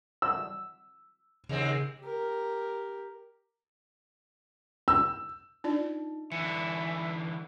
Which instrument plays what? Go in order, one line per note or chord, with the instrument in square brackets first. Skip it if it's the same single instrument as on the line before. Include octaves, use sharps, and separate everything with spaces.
[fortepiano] E6
[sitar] D#2 G#3 C4 [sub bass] C#3
[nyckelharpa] G4 A#4
[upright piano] E6
[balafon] D4 F4 D5 [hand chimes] D#4
[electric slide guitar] D3 E3 [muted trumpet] E5 [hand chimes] C#7